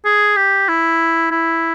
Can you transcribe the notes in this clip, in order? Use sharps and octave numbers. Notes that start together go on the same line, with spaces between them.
G#4
G4
E4
E4